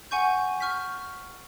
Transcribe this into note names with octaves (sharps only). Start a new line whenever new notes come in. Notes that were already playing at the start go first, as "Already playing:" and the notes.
F#5 G#5 C#6 G6
C#6 F6 G6 B6